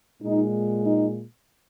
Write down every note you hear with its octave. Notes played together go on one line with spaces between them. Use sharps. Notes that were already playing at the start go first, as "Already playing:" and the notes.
A#2 G#3 D#4
D#4